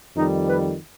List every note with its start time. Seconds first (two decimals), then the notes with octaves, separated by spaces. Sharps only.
0.16 F2 D#3 G3 D#4
0.47 B4